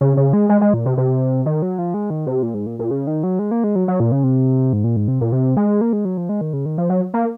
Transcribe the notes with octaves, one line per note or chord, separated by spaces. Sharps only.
C#3
C#3
G#3
G#3
G#3
A#2
C3
C3
D#3
F#3
F3
G#3
D#3
C3
A#2
G#2
A#2
A#2
C#3
D#3
F#3
G#3
A#3
G#3
F#3
F#3
A#2
C#3
C3
G#2
A#2
G#2
C3
A#2
C3
G#3
A#3
G#3
F#3
F3
G#3
D#3
C#3
D#3
F3
F#3
A#3